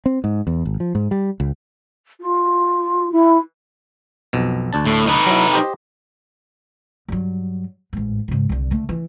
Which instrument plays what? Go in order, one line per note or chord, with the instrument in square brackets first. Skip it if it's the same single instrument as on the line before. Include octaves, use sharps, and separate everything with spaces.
[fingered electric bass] C4
G#2
E2
G#1
F3
G#2
G3
C#2
[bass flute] F4
E4
[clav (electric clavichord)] B1 F2 B2
D2 D4 A5
[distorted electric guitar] A2
D#4 B4
[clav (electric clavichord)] F#3 E4
G4 C5 D#5
[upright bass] G2 F#3
A1 G#2
G#2 C#3
C2 D3
D3 A3
E3